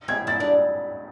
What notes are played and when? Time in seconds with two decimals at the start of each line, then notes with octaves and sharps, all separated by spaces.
0.08 C4 G#6
0.27 E4 A6
0.40 D4